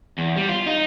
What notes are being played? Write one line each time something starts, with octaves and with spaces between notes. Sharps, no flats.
E2
G3
F4
D#4